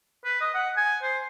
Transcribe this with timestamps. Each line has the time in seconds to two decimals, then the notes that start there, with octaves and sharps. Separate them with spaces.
0.25 B4
0.41 D#5
0.54 F#5
0.77 G#5
1.02 C5